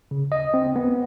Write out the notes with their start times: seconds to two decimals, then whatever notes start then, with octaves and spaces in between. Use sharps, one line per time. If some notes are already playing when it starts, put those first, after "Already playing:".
0.11 C#3
0.32 D#5
0.54 C4
0.76 B3